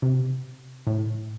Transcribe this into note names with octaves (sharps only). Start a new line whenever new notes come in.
C3
A2